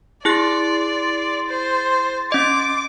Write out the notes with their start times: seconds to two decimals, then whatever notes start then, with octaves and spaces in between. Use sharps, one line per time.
0.25 E4 G#4 D5 C6 F#6 A6
1.49 C5
2.32 C#4 D#5 D6